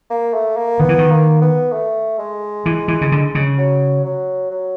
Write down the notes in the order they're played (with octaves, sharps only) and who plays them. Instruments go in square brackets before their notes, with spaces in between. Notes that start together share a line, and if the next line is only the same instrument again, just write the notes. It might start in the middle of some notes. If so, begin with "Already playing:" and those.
[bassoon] A#3
A3
A#3
[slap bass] D#3 [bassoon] B3
[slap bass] E3
D#3
[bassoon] A#3
B3
A3
G#3
[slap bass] E3
E3
C#3
D3
C#3
[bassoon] F#3
F#3
F#3